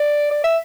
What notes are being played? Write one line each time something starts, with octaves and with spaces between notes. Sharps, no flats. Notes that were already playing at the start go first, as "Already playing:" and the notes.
Already playing: D5
D5
E5